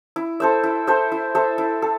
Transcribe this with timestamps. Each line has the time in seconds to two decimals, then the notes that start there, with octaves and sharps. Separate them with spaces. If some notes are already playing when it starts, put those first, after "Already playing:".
0.16 E4
0.40 A4 C5 E5
0.63 E4
0.87 A4 C5 E5
1.12 E4
1.35 A4 C5 E5
1.58 E4
1.82 A4